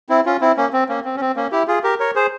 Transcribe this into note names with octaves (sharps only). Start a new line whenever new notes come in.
C4 E4
C#4 F4
C4 E4
A#3 C#4
C4
A#3 C#4
C4
C#4
C4
A#3 C#4
E4 G4
F4 G#4
G4 A#4
A#4 C#5
G#4 C5